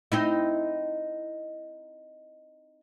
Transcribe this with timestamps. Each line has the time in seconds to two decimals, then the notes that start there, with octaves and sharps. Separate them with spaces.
0.12 C4 D#4 E4